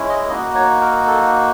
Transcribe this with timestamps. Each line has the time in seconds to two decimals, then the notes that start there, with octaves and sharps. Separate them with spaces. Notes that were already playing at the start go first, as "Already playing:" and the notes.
Already playing: G#3 C#4 E4
0.09 D#5
0.29 A#3 D#4 F#4 D#5
0.55 C#5
0.81 A#4
1.07 A4